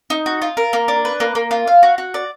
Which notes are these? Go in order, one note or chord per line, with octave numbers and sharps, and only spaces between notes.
D#4
F#4
F4
A#4
A#3
D4
B4
A#3
A#3
F4
F5
F#4
F#4
D5